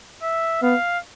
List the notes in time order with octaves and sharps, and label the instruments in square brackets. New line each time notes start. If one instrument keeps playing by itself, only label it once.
[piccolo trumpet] E5
[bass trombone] B3 [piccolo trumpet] F5